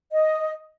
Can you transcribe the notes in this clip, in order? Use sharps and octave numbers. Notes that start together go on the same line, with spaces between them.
D#5